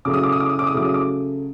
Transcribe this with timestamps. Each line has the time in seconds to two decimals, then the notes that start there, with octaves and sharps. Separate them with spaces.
0.05 C#3 F#3 A3 D6
0.14 D#6
0.23 D6
0.32 D#6
0.40 D6
0.49 D#6
0.59 D6
0.67 D#6
0.74 C#3 F#3 A3 D6
0.85 D#6
0.94 D6